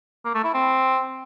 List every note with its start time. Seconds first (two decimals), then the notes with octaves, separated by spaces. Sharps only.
0.25 A#3
0.35 A3
0.44 E4
0.54 C4